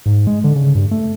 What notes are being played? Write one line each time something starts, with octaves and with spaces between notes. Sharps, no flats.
G#2
G#3
D3
C#3
G2
A3